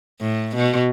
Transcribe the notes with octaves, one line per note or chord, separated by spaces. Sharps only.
A2
B2